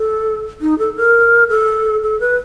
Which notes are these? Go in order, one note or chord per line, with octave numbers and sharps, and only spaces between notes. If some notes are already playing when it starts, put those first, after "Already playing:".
Already playing: A4
D#4
A4
A#4
A4
A4
B4